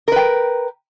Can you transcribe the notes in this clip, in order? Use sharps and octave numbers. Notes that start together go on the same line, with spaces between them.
A#4 B4 G5